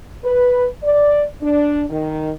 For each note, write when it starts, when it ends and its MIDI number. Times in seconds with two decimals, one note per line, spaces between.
0.25 0.66 71
0.83 1.24 74
1.42 1.84 62
1.90 2.30 51